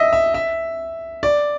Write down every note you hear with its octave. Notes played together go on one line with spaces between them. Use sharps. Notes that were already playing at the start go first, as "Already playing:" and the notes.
Already playing: D#5 E5
E5
E5
D5